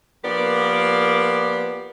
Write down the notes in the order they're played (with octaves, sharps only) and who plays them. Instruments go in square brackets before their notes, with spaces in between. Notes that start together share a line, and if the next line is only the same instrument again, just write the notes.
[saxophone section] F3 A#3 B3 G4 A#4 D5